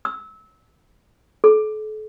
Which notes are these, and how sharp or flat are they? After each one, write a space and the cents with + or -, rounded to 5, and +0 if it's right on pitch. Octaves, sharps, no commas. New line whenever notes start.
E6 -25
A4 -40